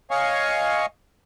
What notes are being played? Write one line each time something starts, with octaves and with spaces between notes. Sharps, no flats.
C#5 D#5 F5 G#5 C#6